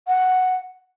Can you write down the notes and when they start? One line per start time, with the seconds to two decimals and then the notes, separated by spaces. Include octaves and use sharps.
0.08 F#5